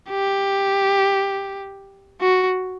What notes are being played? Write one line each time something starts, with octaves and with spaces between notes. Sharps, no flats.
G4
F#4